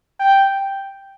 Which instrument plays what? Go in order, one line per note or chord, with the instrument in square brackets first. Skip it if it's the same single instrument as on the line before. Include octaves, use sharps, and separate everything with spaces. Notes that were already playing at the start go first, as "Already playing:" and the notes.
[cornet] G5